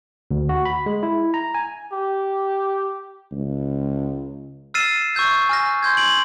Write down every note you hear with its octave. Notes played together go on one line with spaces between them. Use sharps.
D2
F#4
B5
G#3
E4
A#5
G#5
G4
C#2
E6 F6 A6 C7 D#7 E7
C#6 E6 G6 G#6
G#5 F6 A#6
C6 G6 G#6
G#6 D7 F#7